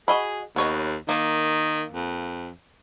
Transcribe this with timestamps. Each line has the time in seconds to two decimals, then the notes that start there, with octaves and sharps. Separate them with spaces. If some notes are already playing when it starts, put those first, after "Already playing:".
0.08 F#4 G#4 D#5 B5
0.56 D#2 B3 C#5 D#5
1.09 D#3 A#3
1.92 F2